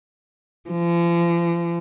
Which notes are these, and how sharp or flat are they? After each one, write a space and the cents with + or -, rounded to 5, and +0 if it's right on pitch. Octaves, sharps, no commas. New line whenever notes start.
F3 -40